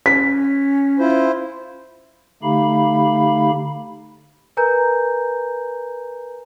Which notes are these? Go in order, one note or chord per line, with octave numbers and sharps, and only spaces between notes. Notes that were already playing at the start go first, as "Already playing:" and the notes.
C#4 B6
E4 F4 C5
D3 A3 D#4 G4 F5 B5
A#4 B4 G#5 A#5 G6